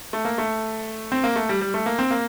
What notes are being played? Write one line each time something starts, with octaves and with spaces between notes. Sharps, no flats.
A3
A#3
A3
C4
A#3
A3
G3
G3
A3
A#3
C4
A#3